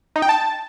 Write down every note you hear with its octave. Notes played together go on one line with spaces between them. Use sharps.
D#4
G5
A5